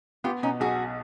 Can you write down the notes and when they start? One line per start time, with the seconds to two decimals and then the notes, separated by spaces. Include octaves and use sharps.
0.24 B3 F4 G4
0.43 B2 C#4 D#4
0.60 B1 F#4 G#4